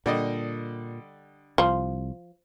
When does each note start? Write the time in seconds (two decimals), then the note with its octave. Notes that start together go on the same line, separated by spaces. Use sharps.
0.06 A#2 D3 G3 D#5
1.58 C2 F3